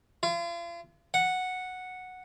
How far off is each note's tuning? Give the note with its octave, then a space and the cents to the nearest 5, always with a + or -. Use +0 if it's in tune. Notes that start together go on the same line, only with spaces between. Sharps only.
F4 -40
F#5 -5